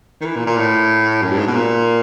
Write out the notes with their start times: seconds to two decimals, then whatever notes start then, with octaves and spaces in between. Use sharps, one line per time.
0.21 D#3
0.25 E3
0.36 A#2
0.46 A#2
0.58 A2
1.22 F#2
1.30 G2
1.38 G#2
1.46 B2
1.54 A#2